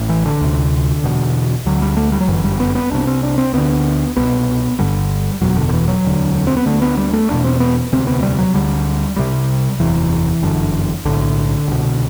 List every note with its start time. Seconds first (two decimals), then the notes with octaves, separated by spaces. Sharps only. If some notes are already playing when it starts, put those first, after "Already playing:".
Already playing: A1 A2
0.09 E3
0.25 D3
0.41 D2 C3
1.04 E1 E2 B2
1.66 D2 D3 F#3
1.82 G3
1.97 A3
2.12 G3
2.20 F#3
2.28 G1 F#2 D3 E3
2.44 G3
2.60 B3
2.75 B3
2.91 C2 C3 D4
3.07 C4
3.23 D4
3.38 C4
3.53 D2 D3 B3
4.16 C2 B2 B3
4.79 G1 G2 D3 G3
5.41 F#1 E2 B2 F#3
5.57 D3
5.69 D3
5.73 E3
5.88 F#3
6.05 E1 D2 D3
6.47 C4
6.57 B3
6.66 D2 D3 A3
6.82 B3
6.97 G3
7.13 A3
7.30 E1 E2 B2 D4
7.44 C4
7.60 B3
7.92 E1 D2 C3 C4
8.07 B3
8.23 G3
8.38 F#3
8.54 D2 D3 G3
9.16 C2 C3 G3
9.80 F#1 E2 C3 E3
10.42 G1 F#2 D3
11.05 B1 A2 D3
11.67 C2 B2